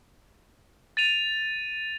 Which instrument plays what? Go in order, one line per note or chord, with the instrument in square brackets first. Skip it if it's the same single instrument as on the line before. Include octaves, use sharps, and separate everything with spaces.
[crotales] A6 D#7 F7